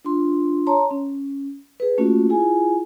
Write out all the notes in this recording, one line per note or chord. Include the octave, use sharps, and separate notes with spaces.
D4 F4 C6
C#5 A5 A#5 C6
C#4
G#4 B4
A3 A#3 C#4 F4 F#4
E4 F4 G#4 G#5